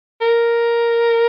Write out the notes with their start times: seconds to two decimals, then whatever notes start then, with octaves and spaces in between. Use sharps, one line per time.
0.21 A#4